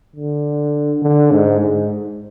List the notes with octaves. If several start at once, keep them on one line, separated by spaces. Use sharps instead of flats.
D3
D3
G#2
G#2